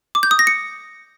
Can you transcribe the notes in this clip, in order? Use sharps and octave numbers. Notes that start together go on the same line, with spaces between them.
D6
G6
D#6
A#6
C#7